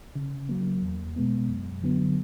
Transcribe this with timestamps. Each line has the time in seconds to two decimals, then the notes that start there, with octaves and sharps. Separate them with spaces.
0.15 C#3
0.49 F#3 A#3
0.82 E2
1.16 B2 G#3 B3
1.49 F#2
1.83 D3 F#3 B3